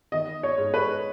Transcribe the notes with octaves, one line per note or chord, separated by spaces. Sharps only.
D#3 D#5
C#5
G#2
B4